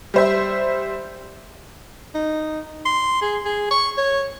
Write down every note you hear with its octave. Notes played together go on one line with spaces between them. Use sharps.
G3 C5 E5
D#4
C6
G#4
G#4
C#6
C#5